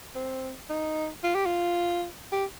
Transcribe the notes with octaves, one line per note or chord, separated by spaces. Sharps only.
C4
D#4
F4
G4
F4
G4